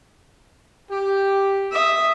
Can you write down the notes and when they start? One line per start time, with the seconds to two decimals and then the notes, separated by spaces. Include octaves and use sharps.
0.91 G4
1.71 E5 D#6